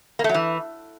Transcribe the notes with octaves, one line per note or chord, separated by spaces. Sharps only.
A#3
A3
F#3
E3